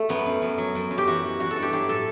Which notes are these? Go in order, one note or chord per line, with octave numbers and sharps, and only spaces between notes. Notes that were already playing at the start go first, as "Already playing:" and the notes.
Already playing: A3
F#2 B3
F#2
F#2
F#3
F#2
F#2
G4
E3 F#4
E3
E3 F#4
A4
G2
G4
F#3 G4
A2 A4